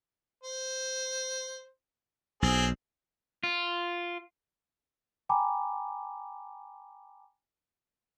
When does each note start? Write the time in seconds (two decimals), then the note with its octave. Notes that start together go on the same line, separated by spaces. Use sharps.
0.44 C5
2.42 B1 C4 G#4
3.43 F4
5.29 G5 G#5 A#5 B5 D6